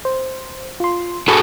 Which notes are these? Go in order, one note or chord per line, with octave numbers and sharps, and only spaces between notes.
C5
F4 C6
F#4 G#4 A4 B5 C#6 A#6